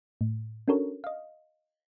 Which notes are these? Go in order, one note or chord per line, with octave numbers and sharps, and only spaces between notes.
A2
C#4 D4 F#4 A4 A#4 C#5
D#5 F5